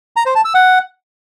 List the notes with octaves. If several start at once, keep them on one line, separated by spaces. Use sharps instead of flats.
A#5
C5
A5
E6
F#5